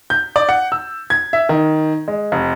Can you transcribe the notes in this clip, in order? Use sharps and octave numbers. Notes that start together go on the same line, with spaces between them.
G6
D5
F#5
E6
G#6
E5
D#3
G#3
F1